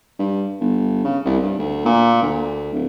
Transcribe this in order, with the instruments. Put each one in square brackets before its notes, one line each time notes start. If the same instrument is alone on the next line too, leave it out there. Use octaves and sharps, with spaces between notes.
[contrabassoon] G2
G1
C#3
C2
G2
D2
A#2
D2
D1